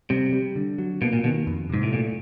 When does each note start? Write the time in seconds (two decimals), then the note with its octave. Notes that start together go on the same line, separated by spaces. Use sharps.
0.10 C3 G3
0.33 G3
0.56 D3
0.78 F#3
1.02 B2 A#3
1.13 A#2
1.24 B2 D#3
1.47 F2
1.70 G#2 C3
1.83 A2
1.93 A#2 A3